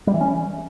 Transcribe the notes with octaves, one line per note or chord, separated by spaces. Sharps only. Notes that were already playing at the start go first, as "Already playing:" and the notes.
G3
E3
C#4